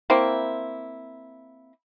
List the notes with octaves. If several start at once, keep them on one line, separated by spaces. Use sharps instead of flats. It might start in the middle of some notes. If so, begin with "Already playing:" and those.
A#3 C4 E4